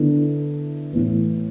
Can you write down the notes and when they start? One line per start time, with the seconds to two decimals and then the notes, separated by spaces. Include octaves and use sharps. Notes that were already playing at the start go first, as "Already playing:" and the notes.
Already playing: D3 B3 E4
0.93 A2 E3 B3